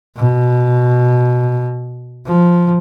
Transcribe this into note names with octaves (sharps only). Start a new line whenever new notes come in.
B2
F3